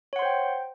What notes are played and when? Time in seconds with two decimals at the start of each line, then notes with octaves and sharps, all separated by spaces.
0.13 C#5
0.16 F#5
0.19 C6
0.22 C5
0.25 G5